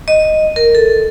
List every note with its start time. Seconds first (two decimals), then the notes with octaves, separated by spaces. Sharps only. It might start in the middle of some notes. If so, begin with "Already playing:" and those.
0.08 D#5
0.56 A#4
0.75 A4